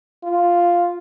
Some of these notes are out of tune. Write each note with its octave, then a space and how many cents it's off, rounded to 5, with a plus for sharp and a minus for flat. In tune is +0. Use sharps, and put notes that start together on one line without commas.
F4 +0